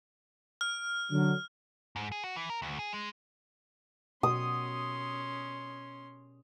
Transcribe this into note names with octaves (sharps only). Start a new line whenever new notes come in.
F6
D3 F#3
G#2
G#4
F#4
E3
A#4
D2
G#4
G#3
B2 C#4 F#4 C6 D#6